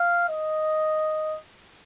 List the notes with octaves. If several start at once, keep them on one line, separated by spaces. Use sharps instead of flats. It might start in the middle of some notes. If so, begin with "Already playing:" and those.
Already playing: F5
D#5